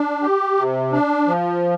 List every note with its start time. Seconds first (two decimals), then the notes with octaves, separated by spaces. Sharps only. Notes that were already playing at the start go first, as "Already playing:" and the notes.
Already playing: D4
0.22 G4
0.57 C3
0.92 D4
1.28 F3